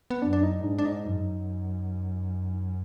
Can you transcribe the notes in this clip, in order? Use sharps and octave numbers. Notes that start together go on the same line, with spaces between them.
B3
F#2 D4
D4
D#4
G#2 D4
D4
D#4
F#2